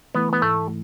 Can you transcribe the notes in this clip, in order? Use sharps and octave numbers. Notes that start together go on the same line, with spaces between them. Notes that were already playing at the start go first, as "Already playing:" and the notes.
E3 A3 B3 E4
B3
G#2 A3